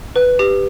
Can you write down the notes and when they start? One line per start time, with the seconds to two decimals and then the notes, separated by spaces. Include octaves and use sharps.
0.16 B4
0.39 G4